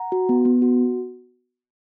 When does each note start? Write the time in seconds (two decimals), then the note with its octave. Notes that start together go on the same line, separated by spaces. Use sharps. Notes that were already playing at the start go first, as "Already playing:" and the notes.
Already playing: F#5 A#5
0.12 F#4
0.29 B3
0.45 B3
0.62 F#4